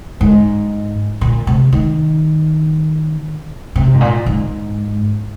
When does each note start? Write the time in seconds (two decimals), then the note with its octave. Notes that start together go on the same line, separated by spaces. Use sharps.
0.21 G#2
1.21 A#2
1.47 C3
1.73 D#3
3.76 C3
3.94 G#2
4.01 A#2
4.26 G#2